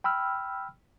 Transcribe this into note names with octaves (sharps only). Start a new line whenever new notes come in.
G5 B5 E6 F6